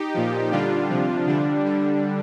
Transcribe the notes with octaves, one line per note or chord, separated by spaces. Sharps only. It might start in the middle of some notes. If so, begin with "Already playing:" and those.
Already playing: D#4 G4
A#2 F3
D3 G3 D4 F4
C3 F3
D3 G3 D4
D3 G3